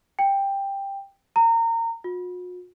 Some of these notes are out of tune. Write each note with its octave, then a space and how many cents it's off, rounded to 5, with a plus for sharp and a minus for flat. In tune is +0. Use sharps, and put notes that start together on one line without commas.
G5 +10
A#5 -25
F#4 -45